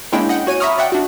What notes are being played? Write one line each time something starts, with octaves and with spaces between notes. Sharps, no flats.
G#3 A#3 C#4 D4 E4 G5
D#5 F#5 G5
F#4 C#5 G#5 D#7
E5 A#5 B5 C#6 D#6 F6
D5 E5 F#5 G5
D4 F#4